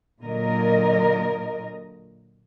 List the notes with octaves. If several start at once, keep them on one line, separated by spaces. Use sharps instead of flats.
A#2 D3 F#3 A#4 D#5